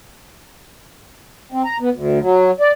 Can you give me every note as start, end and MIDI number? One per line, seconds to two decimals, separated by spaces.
1.52 1.62 60
1.65 1.77 82
1.80 1.89 59
1.93 2.19 38
2.20 2.51 54
2.60 2.71 74